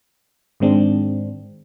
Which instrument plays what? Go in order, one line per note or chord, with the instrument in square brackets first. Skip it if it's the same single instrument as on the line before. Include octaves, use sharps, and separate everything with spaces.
[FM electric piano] G#2 D#3 G#3 C4 D4